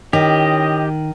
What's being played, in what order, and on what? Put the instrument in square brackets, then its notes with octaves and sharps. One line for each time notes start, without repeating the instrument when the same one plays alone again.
[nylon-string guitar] D#3 [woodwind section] C#4 E4 D#5 [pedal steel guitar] G4